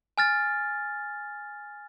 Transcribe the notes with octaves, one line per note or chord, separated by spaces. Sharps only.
G#5 F6 A6